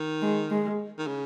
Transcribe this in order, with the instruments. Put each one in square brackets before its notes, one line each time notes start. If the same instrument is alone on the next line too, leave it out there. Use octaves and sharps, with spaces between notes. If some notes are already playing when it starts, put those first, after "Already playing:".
Already playing: [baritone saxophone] D#3
[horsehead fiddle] G#3
G#3
[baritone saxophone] D#3
C#3